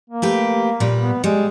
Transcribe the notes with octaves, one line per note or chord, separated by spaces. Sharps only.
A#3
A3 G4 B4
A#2 G3 B4
B3
G3 G#3